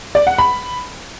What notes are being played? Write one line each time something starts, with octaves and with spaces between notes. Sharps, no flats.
D5
F#5
B5